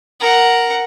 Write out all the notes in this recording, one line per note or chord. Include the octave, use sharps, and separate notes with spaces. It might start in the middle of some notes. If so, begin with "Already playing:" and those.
A#4 F#5